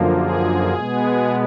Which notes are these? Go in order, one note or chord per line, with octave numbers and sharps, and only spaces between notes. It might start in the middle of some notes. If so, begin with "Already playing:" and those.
Already playing: F#2 D3 F3 A#3
G#4
B2 G#3 B3